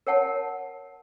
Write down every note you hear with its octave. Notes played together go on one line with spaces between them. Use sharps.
A#4 C#5 F#5 A5